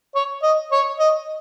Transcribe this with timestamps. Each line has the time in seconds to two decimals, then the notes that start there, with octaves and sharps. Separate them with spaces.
0.15 C#5
0.43 D#5
0.72 C#5
0.99 D#5